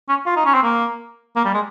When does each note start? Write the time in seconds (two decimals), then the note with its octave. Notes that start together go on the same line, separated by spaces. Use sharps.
0.09 C#4
0.26 F4
0.36 D#4
0.46 C#4
0.54 C4
0.63 A#3
1.36 A#3
1.45 G3
1.54 G#3